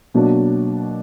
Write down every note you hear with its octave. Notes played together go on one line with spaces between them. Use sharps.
B2 F#3 A#3 D4